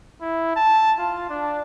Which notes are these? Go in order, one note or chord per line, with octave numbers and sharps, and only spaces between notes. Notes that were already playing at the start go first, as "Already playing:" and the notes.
E4
A5
F4
D4